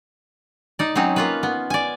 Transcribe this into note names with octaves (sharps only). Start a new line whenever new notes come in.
D#4 D5
F#3 C4 C#4 D#4
A#3 F4 B4
B3
D5 G#5